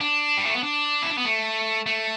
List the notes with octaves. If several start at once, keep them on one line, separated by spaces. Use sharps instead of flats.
D4
G3
A3
B3
D4
E4
D4
B3
A3
A3